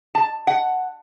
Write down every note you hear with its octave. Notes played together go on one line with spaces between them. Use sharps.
A5
F#5